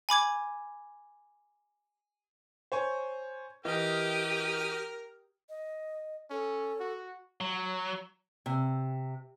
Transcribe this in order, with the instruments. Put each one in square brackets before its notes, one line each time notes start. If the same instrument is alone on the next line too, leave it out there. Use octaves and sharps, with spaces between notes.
[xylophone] G#5 B5 D6 G#6
[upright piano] C5 C#5 G#5
[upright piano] E3 D#5 [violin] G4 D#6 [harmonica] A#4 F6
[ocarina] D#5
[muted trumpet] C#4 [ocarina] A4
[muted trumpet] F#4
[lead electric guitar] F#3
[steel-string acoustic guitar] C3